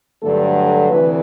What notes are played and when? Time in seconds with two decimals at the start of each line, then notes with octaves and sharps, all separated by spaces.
0.22 G2 D3 F#3 A3 A4
0.89 D2 C3 E3 B4